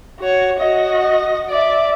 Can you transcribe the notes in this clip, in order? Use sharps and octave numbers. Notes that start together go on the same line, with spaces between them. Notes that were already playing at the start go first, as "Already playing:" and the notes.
F#4 C#5
F#4 D#5
D5 E5